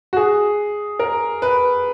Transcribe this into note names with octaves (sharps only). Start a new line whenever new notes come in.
F#4
G#4
A#4
B4